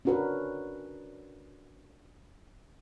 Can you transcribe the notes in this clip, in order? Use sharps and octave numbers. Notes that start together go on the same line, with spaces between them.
C#4 D4 F#4 A#4 B4